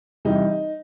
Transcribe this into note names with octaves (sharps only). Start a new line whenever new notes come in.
C3 E3 G3 D#4